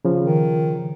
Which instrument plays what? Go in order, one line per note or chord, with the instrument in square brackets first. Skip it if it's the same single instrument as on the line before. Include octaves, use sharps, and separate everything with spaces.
[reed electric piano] C#3 F3
[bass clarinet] D#3